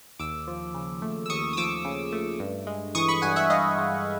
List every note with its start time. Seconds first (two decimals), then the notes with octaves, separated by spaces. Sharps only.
0.19 D#2 D6 E6
0.47 F3
0.74 C#3
1.02 A3
1.26 E6
1.30 D#2 C#6 D#6
1.53 D#6
1.57 F3 D6 E6
1.85 C#3
2.13 A3
2.40 G2
2.67 G#3
2.95 E3 C#6 D#6
3.08 B5 C#6
3.22 G2 F#5 G#5
3.36 E5 F#5
3.50 G2 D#5 F5
3.78 G#3